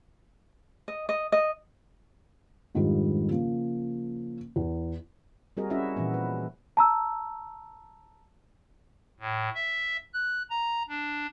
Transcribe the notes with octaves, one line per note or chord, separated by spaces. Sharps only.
D#5
D#5
D#5
F2 G#2 D#3 G3 D4 F4
C#3 F3 A#3
E2
G3 C4 F#4 G#4 A#4 D#5
C#4 E4 F#4 D#5 E5
A#2 E3 F3 B3
B4
A5 A#5 E6
A2
E5
F#6
A#5
D4